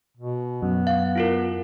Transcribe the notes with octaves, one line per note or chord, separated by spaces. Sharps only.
B2
F#2 B3
F5
E4 F4 A#4